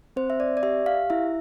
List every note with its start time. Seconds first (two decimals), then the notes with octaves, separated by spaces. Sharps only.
0.16 C4 C5
0.30 E5
0.40 D5
0.57 D5
0.63 G4 E5
0.86 F5
1.10 E4 E5